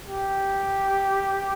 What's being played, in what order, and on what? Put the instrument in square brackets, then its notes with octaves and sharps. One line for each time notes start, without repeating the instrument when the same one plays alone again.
[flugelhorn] G4